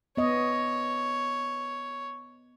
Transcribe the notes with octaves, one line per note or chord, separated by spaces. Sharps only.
B3 C#5 D#5